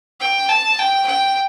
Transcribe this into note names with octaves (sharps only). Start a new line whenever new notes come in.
G5
A5
G5
G5